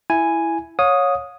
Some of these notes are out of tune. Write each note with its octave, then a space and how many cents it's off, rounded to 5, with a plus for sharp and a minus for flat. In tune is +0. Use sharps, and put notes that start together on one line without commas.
E4 +5 G#5 +0
C#5 +0 F5 +40 D#6 +0